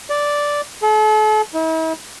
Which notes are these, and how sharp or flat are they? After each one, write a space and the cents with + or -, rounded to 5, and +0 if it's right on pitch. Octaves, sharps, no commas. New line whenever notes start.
D5 -5
A4 -40
E4 -45